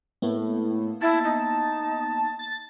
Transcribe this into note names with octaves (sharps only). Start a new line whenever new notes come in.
A2 A#3 B3
E4 A5
D#4
A6